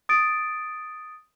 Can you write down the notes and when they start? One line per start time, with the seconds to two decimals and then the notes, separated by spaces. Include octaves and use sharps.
0.09 D#6 A6 D7